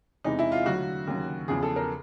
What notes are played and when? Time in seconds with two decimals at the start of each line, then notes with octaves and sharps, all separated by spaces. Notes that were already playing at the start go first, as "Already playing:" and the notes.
0.24 E2 C3 E3 G#3 D#4
0.39 E4
0.52 F4
0.66 D2 D3 F#3 F#4
1.07 D#2 C#3 F#3
1.48 E2 C#3 F3 G#4
1.63 A4
1.76 A#4